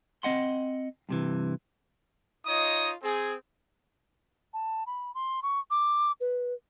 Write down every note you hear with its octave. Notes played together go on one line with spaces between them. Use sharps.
C4 D#5 F#5 C6
G2 C3 E3
D#4 F4 C#5 D#5 D#6
C4 G#4
A5
B5
C6
C#6
D6
B4